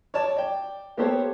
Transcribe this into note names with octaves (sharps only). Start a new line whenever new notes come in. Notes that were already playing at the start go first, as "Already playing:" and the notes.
C#5 D5 A5
D5 G5
A#3 B3 G4 A4 C5 C#5